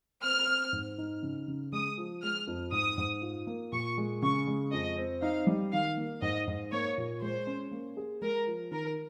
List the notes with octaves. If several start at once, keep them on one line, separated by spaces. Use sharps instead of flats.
C4 F6
C4
G#2
D#4
C#3
C#3
G#3 D#6
F3
G#3 F6
F2
G#2 D#6
G#2
F4
A#3
A#2 C#6
G#3
C#3 C#6
G#3
F2 D#5
C4
D#4 F5
G3
D#3 F5
A#3
G#2 D#5
G#2
A#3 C#5
A#2
G#3 C5
C#4
A#3
G#4
G#3 A#4
F3
D#3 A#4